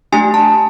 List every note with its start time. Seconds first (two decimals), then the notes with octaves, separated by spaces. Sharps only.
0.12 A3 D4 G4 G#5
0.34 A5